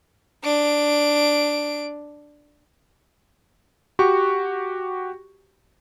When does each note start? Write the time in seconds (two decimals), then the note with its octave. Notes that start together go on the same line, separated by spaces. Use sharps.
0.43 D4 D7
3.99 F#4 G4 C#6